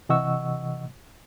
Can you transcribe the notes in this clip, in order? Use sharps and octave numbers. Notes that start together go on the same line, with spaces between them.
C3 E3 D#5 F#5 C#6 E6